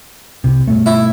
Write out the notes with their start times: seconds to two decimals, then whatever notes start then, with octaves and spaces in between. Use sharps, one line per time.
0.44 C2 C3
0.68 G2 B2 A3
0.86 E4